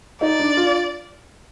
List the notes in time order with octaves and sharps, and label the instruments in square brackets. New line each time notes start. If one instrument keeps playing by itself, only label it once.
[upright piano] D#4 [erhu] D5
[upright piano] D4
F4